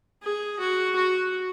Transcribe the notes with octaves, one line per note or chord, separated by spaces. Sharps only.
G#4
F#4
F#4